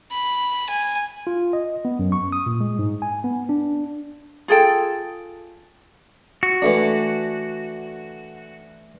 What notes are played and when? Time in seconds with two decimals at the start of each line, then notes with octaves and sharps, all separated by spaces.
0.12 B5
0.70 G#5
1.27 F4
1.53 D#5
1.85 B3
1.99 F#2
2.12 C#6
2.32 D#6
2.46 A#2
2.60 G#3
2.79 G#2
3.02 G#5
3.24 B3
3.49 D4
4.48 F4 G#4 A4 G5
6.43 F#4
6.62 E3 A3 D4